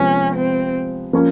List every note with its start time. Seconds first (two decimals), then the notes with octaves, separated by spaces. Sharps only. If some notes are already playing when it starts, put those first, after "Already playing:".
Already playing: C3 F3 G#3 B3 C#4
0.35 C4
1.13 F3 A#3 C#4